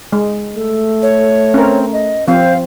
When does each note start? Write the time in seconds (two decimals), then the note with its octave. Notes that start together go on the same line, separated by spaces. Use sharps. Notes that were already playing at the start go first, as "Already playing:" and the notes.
0.12 G#3
0.56 A3 A4
1.02 C#5
1.54 C4 C#4 A#4
1.93 D#5
2.28 F3 C4 C5 F5